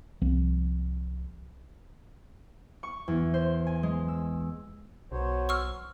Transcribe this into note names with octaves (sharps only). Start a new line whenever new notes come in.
C2 F3 C4
C#6
E2
C5
G#5
G#3
E6
B1 F#3 B3 C5 C#5
C#6 E6 F6